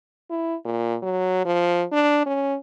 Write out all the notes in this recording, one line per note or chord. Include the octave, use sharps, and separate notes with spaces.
E4
A#2
F#3
F3
D4
C#4